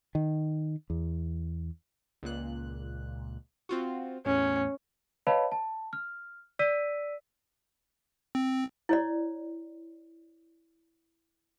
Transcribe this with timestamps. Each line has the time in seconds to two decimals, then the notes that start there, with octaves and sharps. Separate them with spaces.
0.15 D#3
0.90 E2
2.23 C#2 A#2 F#6
3.69 C4 F4 F#4
4.26 E2 A2 C#4
5.27 B4 C#5 D#5 F5 A5 B5
5.52 A5
5.93 F6
6.59 D5 E6 B6 D#7
8.35 C4
8.89 E4 C#5 D5